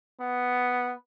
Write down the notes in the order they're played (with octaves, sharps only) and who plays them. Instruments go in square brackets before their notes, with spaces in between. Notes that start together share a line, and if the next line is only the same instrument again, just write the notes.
[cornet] B3